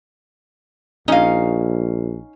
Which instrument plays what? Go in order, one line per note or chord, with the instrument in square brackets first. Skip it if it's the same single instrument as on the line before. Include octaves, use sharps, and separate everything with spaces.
[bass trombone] A#1 [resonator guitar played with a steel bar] C#4 F5 [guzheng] D#4 D#5